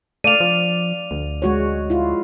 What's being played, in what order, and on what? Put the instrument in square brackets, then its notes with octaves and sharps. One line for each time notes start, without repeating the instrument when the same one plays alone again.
[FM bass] A3 [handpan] D5 F5 [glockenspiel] D#7 F7
[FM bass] F3
D2
[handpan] G#3 F#4 C#5
E4 F4